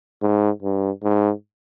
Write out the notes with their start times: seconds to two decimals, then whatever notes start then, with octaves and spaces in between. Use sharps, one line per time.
0.22 G#2
0.62 G2
1.03 G#2